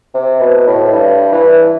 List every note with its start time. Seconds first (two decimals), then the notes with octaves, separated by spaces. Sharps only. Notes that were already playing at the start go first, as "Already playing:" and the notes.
0.15 C3
0.40 B2
0.67 A2
0.93 G2
1.32 E3